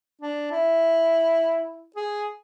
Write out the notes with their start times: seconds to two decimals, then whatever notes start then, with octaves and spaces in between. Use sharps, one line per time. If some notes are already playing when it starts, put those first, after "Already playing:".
0.21 D4
0.51 E4
1.96 G#4